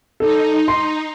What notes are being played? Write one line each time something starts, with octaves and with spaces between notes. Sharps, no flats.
D#4 A4
C6